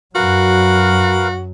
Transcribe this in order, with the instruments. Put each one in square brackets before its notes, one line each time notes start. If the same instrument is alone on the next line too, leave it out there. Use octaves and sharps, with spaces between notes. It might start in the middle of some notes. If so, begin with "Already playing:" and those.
[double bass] F#2 F#3 [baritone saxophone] F#4 [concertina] A#4 B4 F5